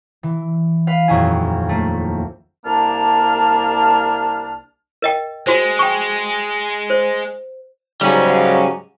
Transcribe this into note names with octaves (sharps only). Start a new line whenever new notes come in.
E3
B4 F5
D#1 F2 F#3 A#3 E4 G#5
A3 A#3
C2 A#3 D4 A5 F6
A#4 D#5 G5
G#3 F#4 C5
G5 C#6
C5
G#2 C#3 F#3 G3 C#4